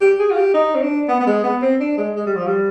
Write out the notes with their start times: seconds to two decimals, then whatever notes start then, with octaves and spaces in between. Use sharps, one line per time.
0.01 G4
0.19 G#4
0.31 F4
0.37 G4
0.54 D#4
0.75 C4
0.82 D4
1.08 B3
1.20 B3
1.27 G#3
1.44 B3
1.62 C4
1.80 D4
1.97 G#3
2.16 G#3
2.26 G3
2.36 F3
2.46 G3